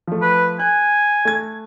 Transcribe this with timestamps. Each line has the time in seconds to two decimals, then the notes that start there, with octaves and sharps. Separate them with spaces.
0.07 F3 A3
0.22 B4
0.60 G#5 F#6
1.25 A3 G#6